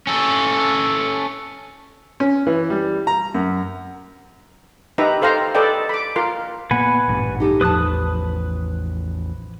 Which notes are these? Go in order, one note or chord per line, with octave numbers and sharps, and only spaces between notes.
C#4 A4
C#4
E3
G3
A#5
F#2
D#4 G4 B4 E5 A#5
A4 C5 F5 G5 A#5
A4 B4 D5 D#5 G5
B5 D6
F4 A#4 C6
A#2 A#3 B3 B4 F#5 G#5
A1 G2 A#2
D#4 G4 A4
A1 E2 F3 B4 A5 D#6 F#6